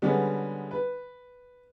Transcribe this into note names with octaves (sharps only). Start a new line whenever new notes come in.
D3 G3 G#3 B3 C#4
B4